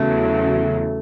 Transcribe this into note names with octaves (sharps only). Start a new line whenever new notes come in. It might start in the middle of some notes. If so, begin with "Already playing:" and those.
Already playing: E2 C#3 F#3 A3